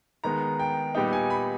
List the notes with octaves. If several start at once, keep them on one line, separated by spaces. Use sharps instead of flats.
D#3 G#3 B3 A#5
G5
A#2 G3 B3 D#4 G5
G#5
B5